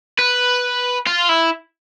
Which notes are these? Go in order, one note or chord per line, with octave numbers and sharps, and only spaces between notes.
B4
F4
E4